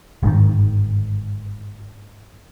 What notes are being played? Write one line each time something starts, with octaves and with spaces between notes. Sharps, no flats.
G1 G#2 C3 D#3